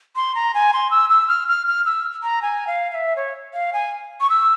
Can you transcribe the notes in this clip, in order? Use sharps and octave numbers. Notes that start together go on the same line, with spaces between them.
C6
A#5
G#5
C6
E6
E6
F6
F6
F6
E6
A#5
G#5
F5
F5
E5
C#5
F5
G#5
C#6
E6